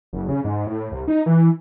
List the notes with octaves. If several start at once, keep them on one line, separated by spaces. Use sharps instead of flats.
F#1
C#3
G#2
A2
C2
D#4
E3